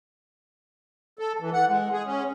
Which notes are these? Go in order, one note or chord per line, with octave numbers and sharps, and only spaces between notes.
A4
E3
F#5
G#3
G#4
C#4